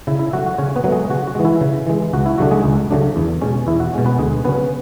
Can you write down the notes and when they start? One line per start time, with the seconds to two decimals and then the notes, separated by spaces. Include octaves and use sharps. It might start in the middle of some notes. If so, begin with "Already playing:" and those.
0.07 C#3 E4
0.19 E4
0.33 F#3 A3 F#4
0.46 F#4
0.58 C#3 C#4 C#5
0.76 B3 B4
0.84 F#3 A3
0.92 G#3 G#4
1.10 C#3 F#4
1.27 F#4
1.35 E3 G#3
1.45 E4
1.61 C#3
1.87 E3 G#3
2.13 C#2 F#4
2.26 E4
2.38 C#3 F#3 A3 D4 F#4
2.51 G#3 G#4
2.64 C#2
2.91 C#3 F#3 A3 D4
3.16 E2
3.42 B2 G#3 C#4
3.67 E2 E4
3.80 F#4
3.93 B2 G#3 C#4
4.06 B3 B4
4.18 D2 G#3 G#4
4.44 C#3 F#3 B3 C#4 B4